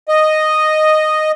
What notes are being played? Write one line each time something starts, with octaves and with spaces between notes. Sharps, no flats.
D#5